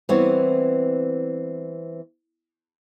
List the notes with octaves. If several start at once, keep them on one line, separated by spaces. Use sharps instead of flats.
E3 G3 B3 C4 C#5